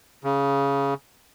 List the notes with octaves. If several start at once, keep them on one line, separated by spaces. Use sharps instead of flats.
C#3